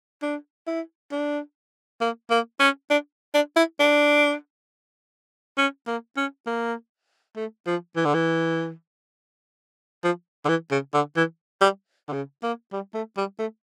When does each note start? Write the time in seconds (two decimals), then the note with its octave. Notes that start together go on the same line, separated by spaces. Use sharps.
0.22 D4
0.67 E4
1.12 D4
2.01 A#3
2.31 A#3
2.60 C#4
2.90 D4
3.34 D4
3.56 E4
3.80 D4
5.58 C#4
5.88 A#3
6.17 C#4
6.47 A#3
7.36 A3
7.67 F3
7.96 E3
8.05 D3
8.14 E3
10.04 F3
10.45 D3
10.49 E3
10.71 C#3
10.94 D3
11.17 E3
11.61 G3
12.09 D3
12.13 C#3
12.43 A#3
12.73 G3
12.95 A3
13.17 G3
13.39 A3